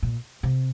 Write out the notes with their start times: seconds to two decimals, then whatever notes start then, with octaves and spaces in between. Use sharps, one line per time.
0.03 A#2
0.43 C3